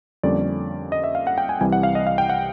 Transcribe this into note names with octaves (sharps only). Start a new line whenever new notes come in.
F2 D3 G3 A#3 C#4 D5
D#5
E5
F5
F#5
G5
G#5
C2 C3 E3 G3 G#5
F#5
F5
D#5
F5
G5
F#5